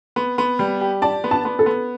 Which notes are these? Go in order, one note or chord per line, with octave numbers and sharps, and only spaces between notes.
B3
B3
G3
G4
D5 A5
B3
A5
B3
A4
B3